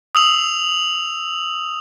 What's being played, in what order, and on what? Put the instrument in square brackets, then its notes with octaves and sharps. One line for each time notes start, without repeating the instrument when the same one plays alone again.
[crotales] D#6 E6 F7